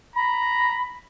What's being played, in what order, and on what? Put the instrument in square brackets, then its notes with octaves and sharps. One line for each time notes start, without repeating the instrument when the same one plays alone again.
[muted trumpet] A#5 [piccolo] B5